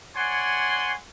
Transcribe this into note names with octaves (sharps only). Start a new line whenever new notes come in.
C#5 D5 F#5 G#5 C6